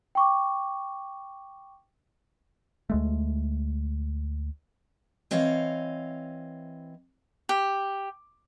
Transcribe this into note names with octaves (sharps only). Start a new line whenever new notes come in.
G5 C#6 D6
D2 G#3 A3
E3 C4 C#5 D#5 F5
G4